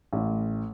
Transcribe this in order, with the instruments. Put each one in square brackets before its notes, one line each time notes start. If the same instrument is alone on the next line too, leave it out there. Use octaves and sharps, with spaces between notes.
[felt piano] A1